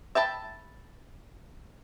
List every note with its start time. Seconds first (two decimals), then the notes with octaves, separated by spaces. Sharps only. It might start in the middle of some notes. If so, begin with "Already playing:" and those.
0.15 E5 G5 A5 B5